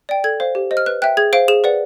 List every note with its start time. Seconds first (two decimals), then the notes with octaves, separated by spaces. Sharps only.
0.09 D5 G5
0.24 A4 G#6
0.40 C5 F5
0.55 G4
0.71 C5 D#5
0.77 F6
0.86 B4 F#6
1.02 E5 G5 F#6
1.17 G#4 G#6
1.33 C5 F5 D7
1.48 G#4 E7
1.64 B4 D5 F#5